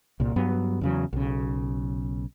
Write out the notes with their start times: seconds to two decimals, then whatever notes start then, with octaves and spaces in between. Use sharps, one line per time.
0.20 C2 A#2
0.36 G2 F#3 B3
0.81 E2 C#3 F#3
1.13 B1 C#3